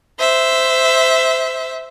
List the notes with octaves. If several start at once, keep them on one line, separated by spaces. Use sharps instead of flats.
C5 E5